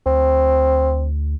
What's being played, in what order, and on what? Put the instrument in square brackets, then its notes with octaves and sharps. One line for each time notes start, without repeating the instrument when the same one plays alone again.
[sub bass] D2 [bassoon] C4